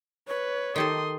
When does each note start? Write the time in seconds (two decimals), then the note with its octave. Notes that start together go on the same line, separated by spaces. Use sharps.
0.28 B4 C#5
0.76 D#3 G4 A4 C6 D#6